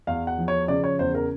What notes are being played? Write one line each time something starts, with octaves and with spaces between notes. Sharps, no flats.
E2 F5
F#5
F3
C#5
C#3 D5
C#5
E2 C5
A#4